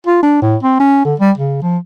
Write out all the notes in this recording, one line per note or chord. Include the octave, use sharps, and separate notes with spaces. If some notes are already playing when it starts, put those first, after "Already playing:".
F4
D4
A2
C4
C#4
D3
G3
C#3
F3